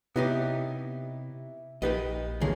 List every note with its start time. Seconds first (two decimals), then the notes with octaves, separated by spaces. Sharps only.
0.16 C3 B3 D#4 E4 G4 C#5
1.82 A#1 A#3 D#4 G4 B4 D#5
2.41 D1 D#2 A#3 G#4 C#5